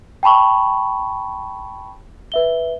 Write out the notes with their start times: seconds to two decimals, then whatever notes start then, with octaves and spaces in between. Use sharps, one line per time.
0.23 G5 A5 B5 C#6
2.32 B4 E5 G7